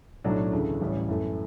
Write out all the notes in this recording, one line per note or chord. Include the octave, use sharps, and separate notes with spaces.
B1 A2 F#3 A3 D4
D2 C#3 E3 A3
A1 A2 E3 G3 C#4
F#2 E3 A3